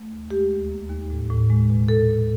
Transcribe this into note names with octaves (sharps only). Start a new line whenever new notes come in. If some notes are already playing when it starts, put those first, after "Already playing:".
Already playing: A3
D#2
G#3 G4
D2
A#3
D#2
A2
A2
G#3
B2
A#2 A4
A#2